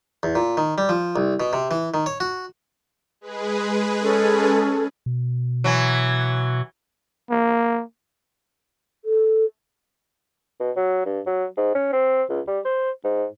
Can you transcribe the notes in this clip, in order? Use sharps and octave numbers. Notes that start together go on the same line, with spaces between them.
E2
A#2
D#3
G3
F3
C2
B2
C3
E3
D#3
C#5
F#4
G#3 G#4 B4
C#4 A4
B2
E3 F#3
A#3
A4
B2
F#3
G2
F#3
G#2
C#4
C4
C#2
G3
C5
G#2